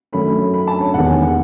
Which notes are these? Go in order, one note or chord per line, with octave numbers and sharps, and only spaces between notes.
F#2 D#3 A3 C#4 B5
B5
A5
C#5
E1 D#2 D#3 G#3 B3 F#5
G#5
F#5